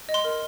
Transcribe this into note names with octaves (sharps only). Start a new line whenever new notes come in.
D#5
C6
A#4